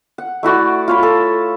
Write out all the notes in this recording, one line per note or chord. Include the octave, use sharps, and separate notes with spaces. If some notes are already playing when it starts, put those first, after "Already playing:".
F#5
A3 E4 F#4 D5
F4 C#5 B5
A4